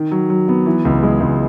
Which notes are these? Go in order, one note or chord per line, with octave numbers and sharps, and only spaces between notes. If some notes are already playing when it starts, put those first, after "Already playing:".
Already playing: D#3
F#3
F#3
B3
E3
C#2
G#3
C#2